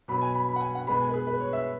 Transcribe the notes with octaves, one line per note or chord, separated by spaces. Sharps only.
B2 F#3 B3 B5
G#5
B5
B5
F#5
G#5
F#5
B2 G#3 B3 B5
G#5
B4
G#4
B4
C#5
E5